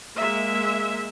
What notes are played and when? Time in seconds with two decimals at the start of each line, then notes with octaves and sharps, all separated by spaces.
0.16 G#3 A#3 E5